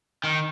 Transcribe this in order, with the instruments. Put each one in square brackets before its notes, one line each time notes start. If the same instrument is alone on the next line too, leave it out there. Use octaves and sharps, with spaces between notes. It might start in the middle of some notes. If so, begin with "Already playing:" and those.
[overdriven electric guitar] D#3